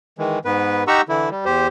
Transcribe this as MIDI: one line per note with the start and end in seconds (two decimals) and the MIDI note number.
0.18 0.39 51
0.18 0.39 52
0.18 0.39 56
0.45 0.84 44
0.45 0.84 59
0.45 0.84 71
0.88 1.01 63
0.88 1.01 67
0.88 1.01 78
0.88 1.01 82
0.88 1.01 85
0.88 1.01 88
1.09 1.29 50
1.09 1.29 52
1.09 1.29 64
1.31 1.45 55
1.45 1.68 40
1.45 1.68 67
1.45 1.68 72